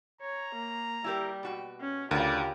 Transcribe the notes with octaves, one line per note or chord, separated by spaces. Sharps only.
C#5 A#5
A#3
G3 E4 G4 A#4
B2 F#4 G5
C#4
D2 C#3 F4 G4 A#4 D5